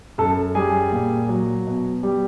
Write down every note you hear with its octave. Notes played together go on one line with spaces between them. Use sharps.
F#2 A4 A5
G3 G#4 G#5
A#2
F#3
B2
G3